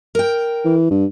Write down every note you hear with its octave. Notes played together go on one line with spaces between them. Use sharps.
A#4 G5
E3
G2